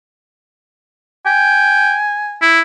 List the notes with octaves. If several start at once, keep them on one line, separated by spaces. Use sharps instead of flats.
G5 G#5
E4